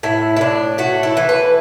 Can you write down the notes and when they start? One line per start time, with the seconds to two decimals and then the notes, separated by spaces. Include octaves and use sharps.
0.03 A2 E4
0.37 E4
0.41 A2 D4
0.78 A3 F#4
1.03 E4
1.17 E3
1.29 B4